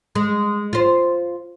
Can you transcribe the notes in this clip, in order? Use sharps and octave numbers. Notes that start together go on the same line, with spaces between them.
G#3
F4 C5